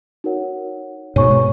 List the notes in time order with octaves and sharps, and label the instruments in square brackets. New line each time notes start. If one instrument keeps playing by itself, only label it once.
[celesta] D#4 F#4 A#4 C#5 F#5
[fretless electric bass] G#2 B2 [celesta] C#5 G#5 C#6
[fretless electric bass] B2